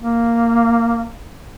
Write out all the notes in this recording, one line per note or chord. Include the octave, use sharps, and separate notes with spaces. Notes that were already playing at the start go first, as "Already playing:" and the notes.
A#3